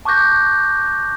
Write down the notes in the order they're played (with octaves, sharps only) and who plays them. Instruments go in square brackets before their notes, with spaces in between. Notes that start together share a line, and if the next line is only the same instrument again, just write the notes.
[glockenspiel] A5 C#6 D6 F#6 G6 A#6